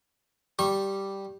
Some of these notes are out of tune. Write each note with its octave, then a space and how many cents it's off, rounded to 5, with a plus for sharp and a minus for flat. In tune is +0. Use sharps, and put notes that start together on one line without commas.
G3 -5 C#6 -35